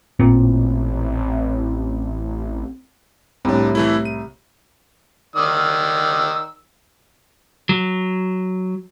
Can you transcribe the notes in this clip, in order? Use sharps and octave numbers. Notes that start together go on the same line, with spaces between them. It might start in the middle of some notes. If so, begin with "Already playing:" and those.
A1 A#2 C4
C2 A2 C3 D4
E3 A3 E4
D#7
D#3 D5 E6
F#3